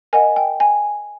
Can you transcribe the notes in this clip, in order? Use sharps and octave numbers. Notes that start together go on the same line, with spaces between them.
A#4 D#5 F#5 G#5
G5
G#5